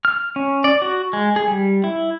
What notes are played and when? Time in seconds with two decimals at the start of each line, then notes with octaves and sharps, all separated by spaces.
0.05 F6
0.36 C#4
0.64 D5
0.82 F#4
1.13 G#3
1.36 G#4
1.48 G3
1.84 E4